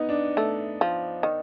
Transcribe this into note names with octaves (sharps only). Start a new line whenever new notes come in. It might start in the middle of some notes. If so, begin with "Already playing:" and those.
Already playing: B3 D#4
D4
A3
F3
D#3